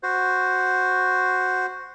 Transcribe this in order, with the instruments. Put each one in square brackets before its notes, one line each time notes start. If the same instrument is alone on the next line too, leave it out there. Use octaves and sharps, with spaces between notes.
[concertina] F#4 C5